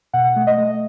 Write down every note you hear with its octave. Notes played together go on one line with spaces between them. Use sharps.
B2 F#5
A3
D#5
A3